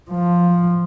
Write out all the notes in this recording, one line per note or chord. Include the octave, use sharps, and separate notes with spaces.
F3